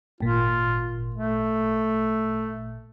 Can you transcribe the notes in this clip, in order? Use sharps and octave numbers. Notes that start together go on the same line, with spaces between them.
G#1 A#2 F4
A3